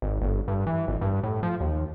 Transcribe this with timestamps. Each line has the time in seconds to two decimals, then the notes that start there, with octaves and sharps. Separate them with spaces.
0.02 G#1
0.22 G1
0.48 G2
0.67 E3
0.88 G#1
1.01 G2
1.23 A2
1.43 F3
1.60 D#2